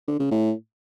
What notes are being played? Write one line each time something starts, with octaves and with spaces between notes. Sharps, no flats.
D3
C#3
A2